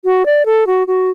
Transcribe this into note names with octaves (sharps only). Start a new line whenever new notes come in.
F#4
D5
A4
F#4
F#4